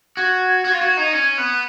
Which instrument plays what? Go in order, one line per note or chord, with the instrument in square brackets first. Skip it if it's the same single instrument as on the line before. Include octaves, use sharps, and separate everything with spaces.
[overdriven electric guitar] F#4 [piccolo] G#6
[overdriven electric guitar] F#4
F4
F#4
D#4
[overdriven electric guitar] C#4 [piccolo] G#6
[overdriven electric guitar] B3 [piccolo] F#6